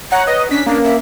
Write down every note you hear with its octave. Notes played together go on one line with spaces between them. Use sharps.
C#5 F#5 A#5
B4 D#5
C#4 D4 B6
A#3 D4
E5